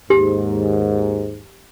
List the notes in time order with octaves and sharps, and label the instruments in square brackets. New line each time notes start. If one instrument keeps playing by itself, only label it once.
[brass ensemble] D#2 G#2 [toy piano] G4